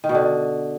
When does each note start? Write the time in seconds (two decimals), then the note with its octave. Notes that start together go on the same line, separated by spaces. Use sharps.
0.04 D#3
0.09 B2
0.15 D3